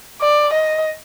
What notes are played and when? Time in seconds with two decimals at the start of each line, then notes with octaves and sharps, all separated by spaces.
0.22 D5
0.53 D#5